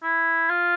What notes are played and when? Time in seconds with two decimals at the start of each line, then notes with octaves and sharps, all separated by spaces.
0.03 E4
0.49 F4